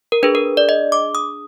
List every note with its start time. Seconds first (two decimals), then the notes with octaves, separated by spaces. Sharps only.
0.12 A#4
0.23 D4 G#4 B4
0.35 A#4
0.57 D5
0.69 D#5
0.92 D6
1.15 D#6